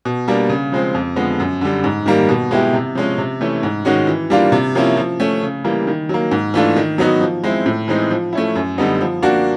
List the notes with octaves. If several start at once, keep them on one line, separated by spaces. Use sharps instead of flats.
B2
G3 A#3 D4
C#3
F3 G#3 C4
F2
D3 F3 G#3 B3
F#2
D3 G3
G#2
D#3 G3 A#3
B2
G#3 B3 E4 G4
C3
F3 G#3 C#4
C3
E3 A3 C#4
G#2
D#3 G#3 C#4 F#4
E3
G3 A#3 D4 F4
C3
F3 A#3 C#4 E4
F3
A3 C#4
C#3
E3 G3 A#3
D#3
F#3 A#3
G#2
E3 A3 D4 F4
D#3
F#3 B3 D#4 F#4
F3
G#3 C4 E4
A2
E3 G#3 C4 D#4
F3
A3 C#4 E4
F#2
D3 G3 B3 D#4
F3
A#3 D4 F#4